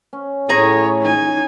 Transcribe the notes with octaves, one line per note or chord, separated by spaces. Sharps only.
C#4
A2 G#4 C#5 A#5 D#6
D#4 G#5